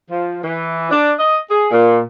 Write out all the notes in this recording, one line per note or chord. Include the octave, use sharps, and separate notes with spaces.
F3
E3
D4
D#5
G#4
A#2